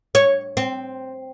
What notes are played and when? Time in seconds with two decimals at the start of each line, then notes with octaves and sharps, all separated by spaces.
0.15 C#5
0.57 C4